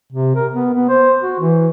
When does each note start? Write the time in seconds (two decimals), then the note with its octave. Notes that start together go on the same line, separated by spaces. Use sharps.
0.13 C3
0.36 A#4
0.52 B3
0.74 B3
0.89 C5
1.22 F#4
1.40 E3